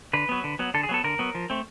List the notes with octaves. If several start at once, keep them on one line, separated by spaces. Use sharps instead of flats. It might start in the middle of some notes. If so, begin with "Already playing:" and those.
D3 B4
F#3 B3
D3
F#3 B3
D3 A4
G#4
F#3 B3 A4
D3 A#4
F#3 B3
F3
A3 C4